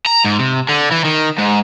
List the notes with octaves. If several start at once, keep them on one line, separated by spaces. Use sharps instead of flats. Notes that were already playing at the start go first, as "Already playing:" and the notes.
A#5
G#2
C3
D3
E3
D#3
G#2